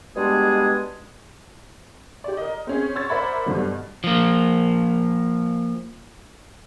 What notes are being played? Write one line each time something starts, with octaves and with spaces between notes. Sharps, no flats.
B2 G3 G#3 B3 D4 G#4
G4 D5
A#4 D#5
C4 C#4 G#4
C#5 C#6 E6 G#6 A6
A#4 C5 D5 E5 F#5 B5
G2 B2 D3 F#3
F3 A#3